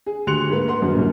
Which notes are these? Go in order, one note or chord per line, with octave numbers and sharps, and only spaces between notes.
G#4
D2 G4 C6 F#6 C#7 F7
G#2 A#3 B4
A#4 B4 F#5 C6
F#2
C2 F#2 A#2